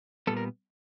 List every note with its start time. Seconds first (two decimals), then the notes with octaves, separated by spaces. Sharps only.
0.27 A#2 G3 B3 A4
0.37 A#4